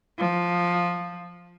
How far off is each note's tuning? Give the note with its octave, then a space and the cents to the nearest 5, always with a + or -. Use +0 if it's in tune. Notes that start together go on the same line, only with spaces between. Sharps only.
F3 +5